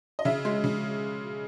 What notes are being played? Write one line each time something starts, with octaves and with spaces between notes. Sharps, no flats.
D#5
C#3 E5
G#3
C#3